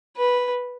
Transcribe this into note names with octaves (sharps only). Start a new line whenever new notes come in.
B4